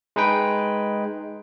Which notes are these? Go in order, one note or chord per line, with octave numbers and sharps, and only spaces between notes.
G#3 D#4 B4 G5